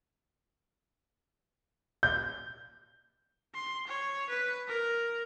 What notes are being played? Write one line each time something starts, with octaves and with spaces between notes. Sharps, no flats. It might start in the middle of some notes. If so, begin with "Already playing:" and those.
G6
C6
C#5
B4
A#4